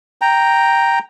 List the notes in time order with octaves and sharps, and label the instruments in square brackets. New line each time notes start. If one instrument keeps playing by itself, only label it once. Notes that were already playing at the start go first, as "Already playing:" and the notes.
[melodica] G5 A#5